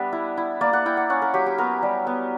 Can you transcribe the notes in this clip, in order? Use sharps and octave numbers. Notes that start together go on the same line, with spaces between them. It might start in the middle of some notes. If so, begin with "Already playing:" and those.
Already playing: G3 B3 D4 B4 E5
E4
E4
A#3 D5
F#5
E4 G5
F#5
C#4 F#5
A#4
F#3 G4
G4
B3 A#4
G3
B3